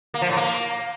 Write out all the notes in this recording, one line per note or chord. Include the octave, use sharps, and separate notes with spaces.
A#3
F3
A2
A#3